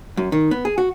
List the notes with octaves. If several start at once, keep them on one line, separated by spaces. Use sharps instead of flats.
F#2
D#3
B3
G#4
F#4